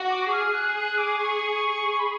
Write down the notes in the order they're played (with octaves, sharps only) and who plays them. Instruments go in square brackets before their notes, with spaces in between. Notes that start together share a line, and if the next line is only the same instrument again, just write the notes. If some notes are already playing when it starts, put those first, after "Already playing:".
Already playing: [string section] F#4
[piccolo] D6
[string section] G#4 [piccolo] F6
[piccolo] F#6
F#6
D6
C#6
B5